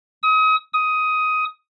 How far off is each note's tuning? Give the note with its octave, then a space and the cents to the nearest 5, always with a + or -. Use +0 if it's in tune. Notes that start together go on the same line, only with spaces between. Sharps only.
D#6 +35
D#6 +15